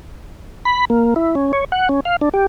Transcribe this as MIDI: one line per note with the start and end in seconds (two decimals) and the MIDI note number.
0.65 0.85 83
0.90 1.14 58
1.16 1.35 64
1.35 1.52 61
1.53 1.65 73
1.72 1.89 78
1.89 2.00 61
2.05 2.16 77
2.21 2.29 62
2.34 2.47 67